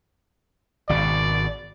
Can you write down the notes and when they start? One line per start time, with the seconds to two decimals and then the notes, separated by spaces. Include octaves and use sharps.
0.89 G#1 B2 D5